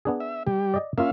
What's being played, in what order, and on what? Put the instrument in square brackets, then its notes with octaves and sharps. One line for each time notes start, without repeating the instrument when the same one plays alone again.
[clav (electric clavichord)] B3 D4 G#4
[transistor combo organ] E5
G3 G4
[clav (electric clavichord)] D5 D#5
[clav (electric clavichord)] A#3 F4 [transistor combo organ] C#4 E5 F5